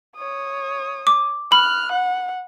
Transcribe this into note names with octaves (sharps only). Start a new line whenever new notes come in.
C#5 D#6
D6
B5 F6 F#6
F#5